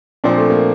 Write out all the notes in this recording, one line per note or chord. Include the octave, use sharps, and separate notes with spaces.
A#2 F3 C4 D4
A3
A#3